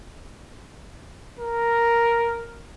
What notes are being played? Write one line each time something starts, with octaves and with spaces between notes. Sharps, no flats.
A#4